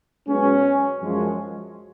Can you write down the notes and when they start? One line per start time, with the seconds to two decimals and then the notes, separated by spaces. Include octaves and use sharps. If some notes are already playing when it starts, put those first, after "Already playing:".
0.28 B1 B2 G#3 B3 C#4
1.01 F#2 F3 G#3 C#4